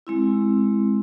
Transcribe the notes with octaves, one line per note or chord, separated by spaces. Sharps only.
G#3 C4 E4